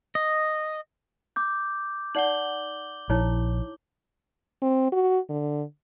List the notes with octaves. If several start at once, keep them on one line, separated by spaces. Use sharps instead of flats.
D#5
D6 G6
D#4 D5 F#5 F#7 G7
A#1 D#4 E4 C#5
C4
F#4
D3